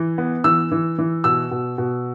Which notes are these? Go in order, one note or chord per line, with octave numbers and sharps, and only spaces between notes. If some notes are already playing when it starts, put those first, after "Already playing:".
Already playing: E3
B3
E3 E6
E3
E3
B2 E6
B2
B2